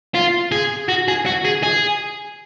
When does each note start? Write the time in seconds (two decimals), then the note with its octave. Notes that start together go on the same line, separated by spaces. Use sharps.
0.15 F4
0.52 G#4
0.89 F#4
1.08 G#4
1.26 F#4
1.45 G#4
1.63 G#4